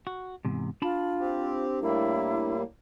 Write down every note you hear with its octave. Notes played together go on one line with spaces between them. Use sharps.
F#4
E2 G#2 C3
D4 F4 A5 B5
C4 G4
A2 G3 A#3 E4